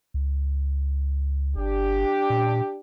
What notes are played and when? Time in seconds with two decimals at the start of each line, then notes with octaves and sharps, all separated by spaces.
0.14 C#2
1.56 G1 D4 G4
2.30 A#2